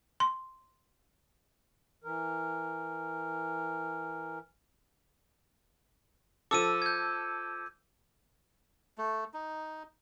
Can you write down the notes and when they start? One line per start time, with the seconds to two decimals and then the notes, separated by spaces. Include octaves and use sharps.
0.20 C6
2.04 E3 A#4
6.51 F3 A4 D6 E6 D#7
6.82 G6 G#6
8.98 A3
9.34 D#4